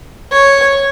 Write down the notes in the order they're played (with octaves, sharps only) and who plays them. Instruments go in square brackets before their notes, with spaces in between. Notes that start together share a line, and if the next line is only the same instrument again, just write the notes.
[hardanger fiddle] C#5